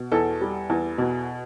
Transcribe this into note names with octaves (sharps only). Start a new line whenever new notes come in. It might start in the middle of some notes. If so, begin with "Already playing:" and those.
Already playing: B2
E2 A4
G3
E2
B2